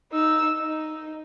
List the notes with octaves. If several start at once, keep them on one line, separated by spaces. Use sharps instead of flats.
D#4 E6
D#4